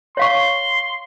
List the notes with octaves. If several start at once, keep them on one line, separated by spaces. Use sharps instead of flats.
C#5 F5 C6 C#6